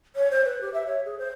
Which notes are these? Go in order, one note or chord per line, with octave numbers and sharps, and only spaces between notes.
C#5
C5
B4
G4
E5
C#5
G#4
C5